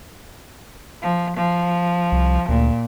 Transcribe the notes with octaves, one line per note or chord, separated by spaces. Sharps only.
F3
F3
C2
D2 A#2